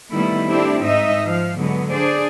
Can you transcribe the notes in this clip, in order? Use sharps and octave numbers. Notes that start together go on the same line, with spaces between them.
D#3 G3 A3 B3 E4
A3 C4 D4 E4 G4
G#2 D#4 D#5 E5
F3 F5
D3 F#3 G#3 B3
D4 G#4 C5 D5